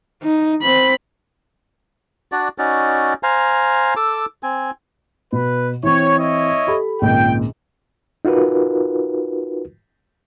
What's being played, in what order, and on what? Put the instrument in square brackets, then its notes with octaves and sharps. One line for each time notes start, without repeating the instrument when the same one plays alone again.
[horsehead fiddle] D#4
C4 B5
[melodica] D4 F#4 D5
C#4 D#4 F#4 D5
C5 F5 G#5 A#5
A4 D6 E6
C4 G#5
[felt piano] B2 [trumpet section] B4
[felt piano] E3 C4 [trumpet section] C#5
[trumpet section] E4 C#5 D#5
[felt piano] G4 A4 B5
[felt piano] G#1 C#2 A#2 [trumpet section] G5
[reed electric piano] D#4 F4 F#4 A#4 B4